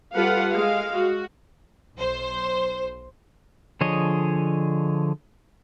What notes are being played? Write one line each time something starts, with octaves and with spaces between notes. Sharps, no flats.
G3 F4 A4 B4 F5 F#5
G#3 F5
F#4
B1 C5
D3 F3 G#4 C#5 D#5